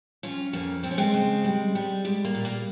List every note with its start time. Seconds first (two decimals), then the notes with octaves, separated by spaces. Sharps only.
0.23 F2 C#4 F4
0.53 F2 A#3 C#4
0.83 F3 C4
0.91 C#4
0.98 G#3 C4
1.14 C#3
1.44 G3
1.75 G3
2.05 G3 G#3
2.25 A#3
2.35 A#2
2.45 A#3